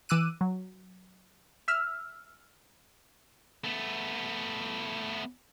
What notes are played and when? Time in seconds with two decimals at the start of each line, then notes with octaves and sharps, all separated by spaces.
0.09 E3 D6 E6 F#6 D#7
0.41 F#3
1.68 E5 E6 F6
3.64 A3 B3